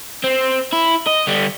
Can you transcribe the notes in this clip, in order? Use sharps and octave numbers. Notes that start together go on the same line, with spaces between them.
C4
E4
D#5
D3 G3